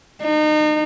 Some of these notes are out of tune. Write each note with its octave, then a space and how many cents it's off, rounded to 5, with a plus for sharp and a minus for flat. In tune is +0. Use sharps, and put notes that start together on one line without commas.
D#4 -35